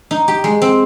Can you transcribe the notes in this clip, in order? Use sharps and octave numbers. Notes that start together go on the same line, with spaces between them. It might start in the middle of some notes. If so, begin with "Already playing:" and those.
D#4
G4
G#3
C4